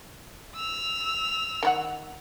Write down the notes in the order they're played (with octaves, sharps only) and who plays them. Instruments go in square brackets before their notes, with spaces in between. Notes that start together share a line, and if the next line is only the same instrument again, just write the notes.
[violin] E6 F7
[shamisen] D#3 E4 F#5